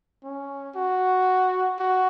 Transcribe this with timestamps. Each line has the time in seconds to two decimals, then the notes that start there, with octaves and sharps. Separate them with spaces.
0.23 C#4
0.75 F#4
1.79 F#4